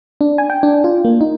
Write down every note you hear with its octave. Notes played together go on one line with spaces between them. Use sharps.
D4
G#5
G5
D4
F4
A#3
D#4